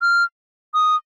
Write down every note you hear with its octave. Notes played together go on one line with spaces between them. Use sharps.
F6
D#6